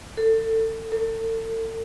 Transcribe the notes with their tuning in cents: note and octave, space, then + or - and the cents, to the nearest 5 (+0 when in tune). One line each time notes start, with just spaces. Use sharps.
A4 +25
A4 +40